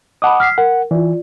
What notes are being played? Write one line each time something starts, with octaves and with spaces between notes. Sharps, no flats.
D#5 F#5 A5 B5 D6 D#6
F6 B6 C7
A#4 F#5
E3 F4 D5